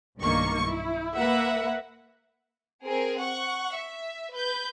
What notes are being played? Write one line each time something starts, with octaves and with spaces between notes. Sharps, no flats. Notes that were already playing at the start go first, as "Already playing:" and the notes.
B1 G2 D#3 A#3 C#6
E4
A#3 B4 E5 F#5
C4 G#4 A#4
F#5 C#6
E5
B4 G6